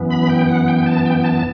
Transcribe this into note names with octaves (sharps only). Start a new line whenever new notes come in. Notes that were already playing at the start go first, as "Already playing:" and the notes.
Already playing: F#2 E3 B3
B5
G5
F#5
G5
A5
G5
A5